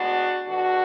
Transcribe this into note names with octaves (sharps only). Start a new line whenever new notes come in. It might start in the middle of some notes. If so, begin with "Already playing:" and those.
Already playing: A2 G#3 B3 D4 F#4
E2 B2 A3 D4 F#4